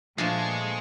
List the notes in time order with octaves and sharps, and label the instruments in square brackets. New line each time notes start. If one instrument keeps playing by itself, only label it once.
[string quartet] A#2 C#6 [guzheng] F3 A3 [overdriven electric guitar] G#3 [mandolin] D4 B4 C5